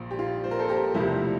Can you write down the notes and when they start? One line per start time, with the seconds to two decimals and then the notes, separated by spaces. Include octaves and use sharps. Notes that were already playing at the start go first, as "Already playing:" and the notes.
Already playing: A#1 A#2 F3
0.11 G4
0.19 F4
0.44 C5
0.51 A#4
0.59 A4 C5
0.68 G4 A#4
0.94 E1 D2 C3 F3 E4 G4